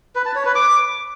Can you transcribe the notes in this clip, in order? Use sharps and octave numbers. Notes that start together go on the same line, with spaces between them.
B4
A5
C#5
B4
D6